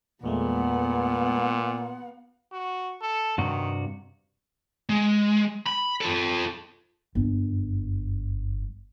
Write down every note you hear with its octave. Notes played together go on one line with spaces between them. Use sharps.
E2 A#2 G#3 A3 B3 F#5
F#4
A4
G2 C3 D#3 F#4
G#3
B5
F4 A4
G1 F#2